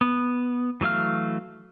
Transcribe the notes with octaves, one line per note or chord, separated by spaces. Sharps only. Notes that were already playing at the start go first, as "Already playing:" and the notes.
B3
E3 F#3 A3 F5 F6